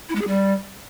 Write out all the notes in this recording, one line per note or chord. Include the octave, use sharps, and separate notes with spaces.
E4
G#3
G#4
G3